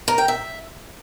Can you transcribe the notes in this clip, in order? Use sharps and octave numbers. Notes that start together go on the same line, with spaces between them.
A#4
G5
E5